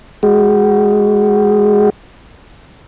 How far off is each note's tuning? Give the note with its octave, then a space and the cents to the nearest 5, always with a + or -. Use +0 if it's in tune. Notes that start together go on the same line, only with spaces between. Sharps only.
G#3 +0 F#4 +15